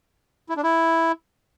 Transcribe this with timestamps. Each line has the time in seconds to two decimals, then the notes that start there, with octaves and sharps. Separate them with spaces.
0.49 E4
0.56 D4
0.63 E4